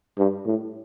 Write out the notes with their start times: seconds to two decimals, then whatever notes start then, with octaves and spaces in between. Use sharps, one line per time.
0.18 G2
0.47 A2